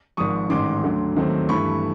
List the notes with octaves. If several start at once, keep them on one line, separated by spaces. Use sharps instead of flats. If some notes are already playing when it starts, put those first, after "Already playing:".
G#1 G#2 F3 C#6 D#6
A1 G#2 D#3 C6 D6
D2 D3 F#3
D#2 D#3 F#3 A3 C4
G2 E3 A3 B5 C#6